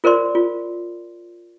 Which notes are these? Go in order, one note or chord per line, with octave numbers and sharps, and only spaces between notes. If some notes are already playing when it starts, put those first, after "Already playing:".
F4 A#4 C5 D5 C6
F4